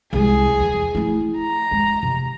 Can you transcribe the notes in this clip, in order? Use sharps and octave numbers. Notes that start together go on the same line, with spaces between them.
C2 G#3 G#4
E2
A3 E4
A#5
G#3
C3